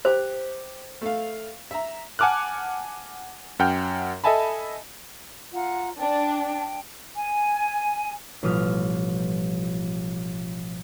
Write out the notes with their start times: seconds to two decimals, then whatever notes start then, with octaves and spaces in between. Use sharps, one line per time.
0.05 G4 C5
1.02 A3 F5
1.71 E5 A#5
2.19 F#5 G#5 A5 D6 F6 F#6
3.59 F#2 F#5 G5 F6 G6
4.24 A4 D#5 E5 G#5 A5 B5
5.54 F4 F#5 A#5
6.00 D4 G5 A5
7.15 G#5
8.43 A1 B2 F3 G3 D#6 F6